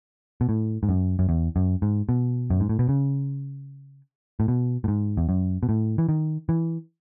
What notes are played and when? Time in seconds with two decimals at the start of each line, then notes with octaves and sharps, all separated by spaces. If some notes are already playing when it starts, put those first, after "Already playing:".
0.41 B2
0.49 A2
0.83 G#2
0.89 F#2
1.19 F#2
1.29 E2
1.56 F#2
1.82 G#2
2.09 B2
2.50 F#2
2.60 G#2
2.69 A2
2.79 B2
2.89 C#3
4.40 A2
4.48 B2
4.84 A2
4.88 G#2
5.17 E2
5.29 F#2
5.63 B2
5.69 A2
5.98 E3
6.09 D#3
6.49 E3